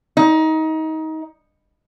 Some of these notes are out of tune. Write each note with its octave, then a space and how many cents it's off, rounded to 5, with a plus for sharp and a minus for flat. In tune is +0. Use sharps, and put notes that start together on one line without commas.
D#4 +25